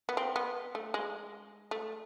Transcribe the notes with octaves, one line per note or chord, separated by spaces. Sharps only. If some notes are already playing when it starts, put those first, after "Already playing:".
B3
C4
B3
A3
G#3
A3